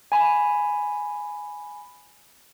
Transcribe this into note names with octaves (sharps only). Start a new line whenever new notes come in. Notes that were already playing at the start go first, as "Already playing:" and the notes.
G#5 B5